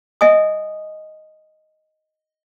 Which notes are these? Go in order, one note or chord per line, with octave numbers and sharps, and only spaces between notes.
D#5 E5 G#5 D#6